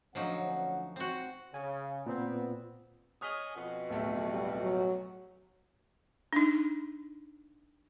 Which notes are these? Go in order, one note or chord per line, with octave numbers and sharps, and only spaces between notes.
D2 F3 F#3 C#4 D#4 F#5
C4 F#4
C#3 G#5
A#2 B3 C4
G#4 C#5 D#5 D#6 F6 B6
F2 B2
D1 B1 A3
G3
F#3
D4 D#4